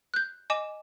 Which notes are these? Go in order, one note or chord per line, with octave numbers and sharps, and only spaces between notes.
F#6 G6
D#5 G#5 D6 E7